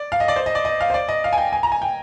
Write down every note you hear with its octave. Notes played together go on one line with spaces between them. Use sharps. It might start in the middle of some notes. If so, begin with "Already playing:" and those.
Already playing: D5
F5
D#5
D5
C5
D#5
D5
D#5
F5
C5
D5
D#5
F5
G#5
G5
G#5
A#5
G#5
G5